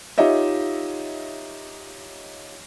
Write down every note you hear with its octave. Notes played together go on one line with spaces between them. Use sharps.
D#4 F4 G4 C#5 D#5 E5